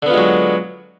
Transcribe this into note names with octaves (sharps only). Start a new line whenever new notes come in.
D3 F#3 G#3 B3 F4